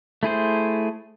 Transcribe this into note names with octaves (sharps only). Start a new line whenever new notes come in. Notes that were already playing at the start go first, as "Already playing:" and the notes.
A3 E4 G#4 C5